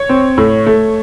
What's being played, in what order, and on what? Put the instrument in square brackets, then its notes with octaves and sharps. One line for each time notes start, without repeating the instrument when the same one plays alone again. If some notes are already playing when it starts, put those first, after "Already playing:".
Already playing: [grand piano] C#5
C4
A2
A3